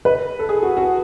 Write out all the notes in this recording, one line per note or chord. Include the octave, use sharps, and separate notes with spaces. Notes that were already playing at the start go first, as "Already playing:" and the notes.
B4
A4
G#4
F#4
F#4